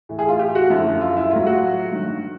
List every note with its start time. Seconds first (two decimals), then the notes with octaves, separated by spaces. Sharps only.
0.09 A2 E3
0.19 G#4
0.29 F4
0.39 G4
0.55 F#4
0.70 F#2 D3 F3 E4
1.01 F4
1.17 E4
1.31 A2 F#3 F4
1.46 F#4
1.92 G2 D#3 F#3